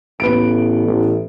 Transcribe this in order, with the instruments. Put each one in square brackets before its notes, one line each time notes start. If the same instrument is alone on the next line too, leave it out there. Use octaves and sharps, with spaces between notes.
[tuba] A1 [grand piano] B3 D7
[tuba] A1